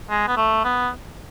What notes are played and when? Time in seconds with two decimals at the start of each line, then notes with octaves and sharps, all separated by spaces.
0.10 G#3
0.28 B3
0.37 A3
0.65 B3